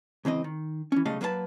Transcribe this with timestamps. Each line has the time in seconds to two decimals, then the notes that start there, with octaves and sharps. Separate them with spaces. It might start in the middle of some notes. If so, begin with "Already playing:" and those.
0.25 C#2 E3 C4 D#5
0.44 D#3
0.92 E3 C#4
1.06 B1 C#3 G3 A3 D#5 F5
1.21 F#3 A#3 B4 C5 A5